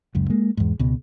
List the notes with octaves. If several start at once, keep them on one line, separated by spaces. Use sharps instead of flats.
F#1 C#2 F#2
G#3 A#3
E2 G#2
C#2 B2